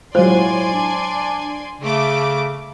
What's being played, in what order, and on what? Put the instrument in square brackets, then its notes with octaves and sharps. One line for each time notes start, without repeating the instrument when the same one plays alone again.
[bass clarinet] A2 [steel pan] F#3 G#3 F4 [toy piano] C5 [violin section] D5 G#5 C6
[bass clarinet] D4
[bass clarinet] C#3 [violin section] A3 D6